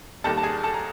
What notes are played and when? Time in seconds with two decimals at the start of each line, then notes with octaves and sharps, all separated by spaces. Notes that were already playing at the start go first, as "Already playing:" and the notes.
0.24 D#2 D#3 G3 A4 A5
0.38 A5
0.43 G#4 G#5
0.63 A4 A5
0.74 A#5